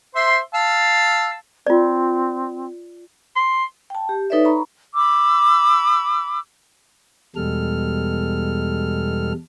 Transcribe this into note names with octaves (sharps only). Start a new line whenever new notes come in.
C5 E5 C6
F5 A5 E6
C4 F4 D5
C6
G5 A5
G4
D#4 A4 B4 C#5 D5 E5
A#5 B5 C#6
B5 D6 E6
E2 B2 G3 G#3 A4 F6